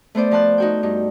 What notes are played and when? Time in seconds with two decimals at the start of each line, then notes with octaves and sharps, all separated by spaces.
0.15 A3 B3 C5 D5
0.31 F3 B3 A5 C6 F#6
0.58 D#4 F#4 G5
0.83 G2 D#4